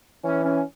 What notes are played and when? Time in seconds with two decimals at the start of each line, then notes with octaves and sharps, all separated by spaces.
0.23 E3 C#4
0.44 C#4